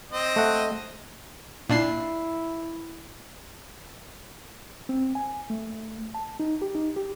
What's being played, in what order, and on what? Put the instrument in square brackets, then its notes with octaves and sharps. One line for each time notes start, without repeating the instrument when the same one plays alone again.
[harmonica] C4 D#5
[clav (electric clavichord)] A3 F#5
[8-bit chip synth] A#2 D4 C7 [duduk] E4
[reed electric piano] C4
G#5
A3
A5
D#4
G4
D#4
G4